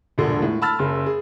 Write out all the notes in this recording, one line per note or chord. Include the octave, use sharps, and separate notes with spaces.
E1 A#1 D3
A2
A5 B5 E6 F6 A6
F#1 C#3
G#4